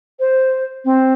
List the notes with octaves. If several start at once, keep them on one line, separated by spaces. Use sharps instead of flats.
C5
C4